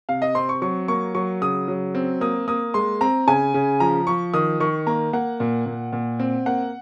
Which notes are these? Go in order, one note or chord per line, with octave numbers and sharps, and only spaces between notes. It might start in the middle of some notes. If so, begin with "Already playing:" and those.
C3 F5
D#5
C4 C6
C#6
F#3 C#6
A#3 C#6
F#3 C#6
C#3 D#6
F#3
C4
A#3 D#6
A#3 D#6
G#3 C6
C4 A#5
C#3 G#5
C#3
F3 A#5
F3 C#6
D#3 D#6
D#3 C#6
A#3 A#5
A#3 F#5
A#2
A#2
A#2
C4
A#3 F#5